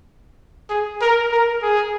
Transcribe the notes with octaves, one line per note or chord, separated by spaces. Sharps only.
G#4
A#4
A#4
G#4